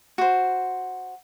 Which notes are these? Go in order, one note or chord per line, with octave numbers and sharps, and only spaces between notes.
F#4 C5